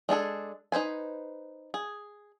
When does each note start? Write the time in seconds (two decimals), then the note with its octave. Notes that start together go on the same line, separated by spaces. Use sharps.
0.09 G#3 D4 G#4 A4
0.72 D#4 B4 C5 G#5
1.74 G#4